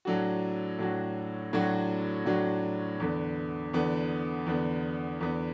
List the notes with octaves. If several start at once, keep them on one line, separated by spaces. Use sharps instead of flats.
A2 F#3 D4 F#4
A2 F#3 D4 F#4
A2 F#3 D4 F#4
A2 F#3 D4 F#4
E2 D3 B3
E2 D3 B3
E2 D3 B3
E2 D3 B3